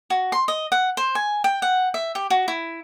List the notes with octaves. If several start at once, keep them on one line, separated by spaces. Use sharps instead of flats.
F#4
C6
D#5
F#5
C5
G#5
G5
F#5
E5
G4
F#4
E4